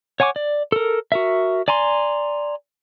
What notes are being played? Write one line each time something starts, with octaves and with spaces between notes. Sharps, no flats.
C#5 F#5 G#5 C#6 D6
D5
A4 A#4
F#4 A#4 E5
D5 G#5 A#5 C6